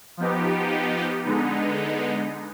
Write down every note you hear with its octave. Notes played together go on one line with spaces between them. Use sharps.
F3 B3 D#4 G4
D3 G#3 B3 D#4